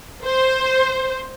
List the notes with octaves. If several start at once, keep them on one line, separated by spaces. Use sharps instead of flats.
C5